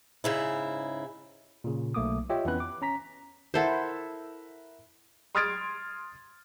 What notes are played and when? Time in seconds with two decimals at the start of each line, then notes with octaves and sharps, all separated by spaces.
0.24 G#2 C#3 E4
1.64 A#2 C#3
1.94 B1 A3 A#3 D6 D#6
2.30 F4 G4 C#5 D#5 E5 G5
2.45 F2 E3 B3 C#4 B4 F#6
2.60 D6
2.82 C#4 A#5 B6
3.54 E4 A4 A#4 C5 E5 F#5
5.35 C6 D#6 F6 G#6 A6 D7